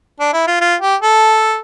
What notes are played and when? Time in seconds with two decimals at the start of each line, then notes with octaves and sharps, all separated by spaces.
0.20 D4
0.33 E4
0.47 F4
0.61 F4
0.81 G4
1.02 A4